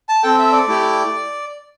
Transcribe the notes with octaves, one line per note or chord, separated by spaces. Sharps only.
A5
C4 A4 G5
E5
D5
A3 E4 G4